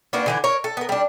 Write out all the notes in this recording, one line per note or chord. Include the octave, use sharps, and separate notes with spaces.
A#3 B3 D4 F#4
D3 E3 D4
A#4 C#5
A4
B3 A#4
G3 D4